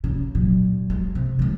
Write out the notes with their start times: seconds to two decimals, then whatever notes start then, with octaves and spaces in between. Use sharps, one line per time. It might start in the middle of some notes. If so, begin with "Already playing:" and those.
0.04 C#3
0.35 A#2 F#3
0.90 G#3
1.15 C3
1.39 D#3 G#3